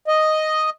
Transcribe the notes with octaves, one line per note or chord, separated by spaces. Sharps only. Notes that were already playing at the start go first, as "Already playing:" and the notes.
D#5